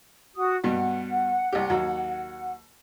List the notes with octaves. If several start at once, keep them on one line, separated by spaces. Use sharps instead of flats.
F#4 D#6
G2 B2 F#5
C2 G4
D#2 F#3